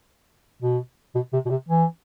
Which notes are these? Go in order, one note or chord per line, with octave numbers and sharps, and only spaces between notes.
B2
B2
C3
B2
C3
E3